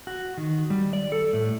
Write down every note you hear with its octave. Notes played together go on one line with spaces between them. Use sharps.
F#4
D#3
G3
D5
A4
A2